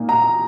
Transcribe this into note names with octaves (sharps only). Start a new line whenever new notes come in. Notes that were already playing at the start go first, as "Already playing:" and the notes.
Already playing: A#2 A#3 D#4
A#5